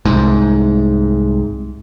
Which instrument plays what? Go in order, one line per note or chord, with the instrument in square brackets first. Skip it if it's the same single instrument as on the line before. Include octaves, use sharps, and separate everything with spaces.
[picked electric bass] C2 G#2